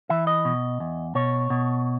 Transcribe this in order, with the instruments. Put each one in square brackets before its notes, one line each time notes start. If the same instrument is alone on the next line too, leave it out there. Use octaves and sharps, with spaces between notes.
[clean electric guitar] E3 E5
D#5
B2
E2
B2 C#5
B2